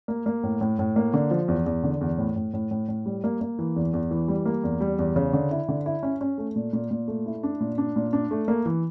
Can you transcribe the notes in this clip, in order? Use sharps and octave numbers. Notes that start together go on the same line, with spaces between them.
A#3
A#3
A2
A2
A2
A#3
D3
F3
E2
E2
D3
E2
A2
A2
A2
A2
A2
G3
A#3
A#3
E3
E2
E2
E3
G3
A#3
E2
G3
E2
C#3
D3
E4
D3
E4
C#4
C#4
A3
A#2
A#2
A#2
A3
E4
D4
A#2
D4
A#2
D4
A3
A#3
E3